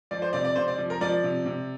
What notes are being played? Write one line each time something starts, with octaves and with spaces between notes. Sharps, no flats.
F3 D5
C5
C3 D5
D5
C3 C5
D5
F3
A#4
F3 D5
C3
C3